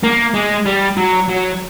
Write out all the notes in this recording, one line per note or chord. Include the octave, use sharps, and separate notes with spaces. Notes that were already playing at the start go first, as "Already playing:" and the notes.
A#3
G#3
G3
F#3
F#3